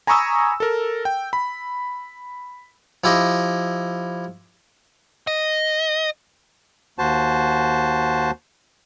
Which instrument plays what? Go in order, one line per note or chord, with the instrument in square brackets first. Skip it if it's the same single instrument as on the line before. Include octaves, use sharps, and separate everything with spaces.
[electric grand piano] G#5 A#5 B5 C#6 D#6 E6
A4 A#4
G5
B5
[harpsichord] F3 E4 G4 D#5
[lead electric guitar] D#5
[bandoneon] D#2 F#4 C5 A5